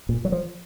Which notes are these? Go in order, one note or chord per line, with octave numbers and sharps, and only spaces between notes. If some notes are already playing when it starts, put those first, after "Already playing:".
A#2
F#3
F3